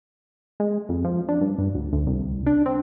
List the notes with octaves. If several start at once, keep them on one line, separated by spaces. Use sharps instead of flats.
G#3
F2
F3
D4
G2
G2
D2
D2
C2
D4
C4